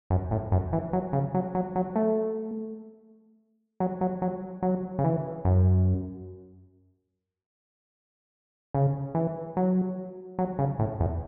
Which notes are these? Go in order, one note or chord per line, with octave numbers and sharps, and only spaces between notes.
F#2
A2
F#2
E3
F#3
C#3
F#3
F#3
F#3
A3
F#3
F#3
F#3
F#3
C#3
E3
F#2
C#3
E3
F#3
F#3
C#3
A2
E2